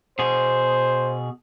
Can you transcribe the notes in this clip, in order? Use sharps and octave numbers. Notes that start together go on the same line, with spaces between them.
B2 G#4 C5